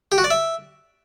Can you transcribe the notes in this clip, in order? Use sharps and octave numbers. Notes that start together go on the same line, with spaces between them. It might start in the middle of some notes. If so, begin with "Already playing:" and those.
G4
F#4
D5
E5